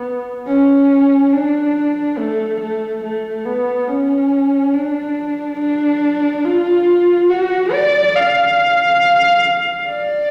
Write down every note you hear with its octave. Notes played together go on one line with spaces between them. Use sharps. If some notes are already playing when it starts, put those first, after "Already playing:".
Already playing: B3
C#4
D4
A3
A3
A3
B3
C#4
D4
D4
F4
F#4
D5
F5
D5